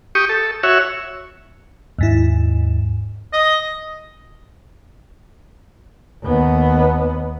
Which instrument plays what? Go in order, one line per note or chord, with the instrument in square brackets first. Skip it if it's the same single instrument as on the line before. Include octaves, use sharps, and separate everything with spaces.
[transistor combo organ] G4 C#6 D#6
A4
F#4 C#5 E5
[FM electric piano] D#2 G#2 E4
[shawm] D#5
[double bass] D#2 B3